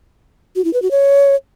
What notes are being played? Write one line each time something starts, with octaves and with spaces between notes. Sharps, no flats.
F#4
E4
B4
F#4
C#5